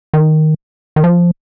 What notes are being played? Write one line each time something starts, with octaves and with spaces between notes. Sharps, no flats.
D#3
D#3
F3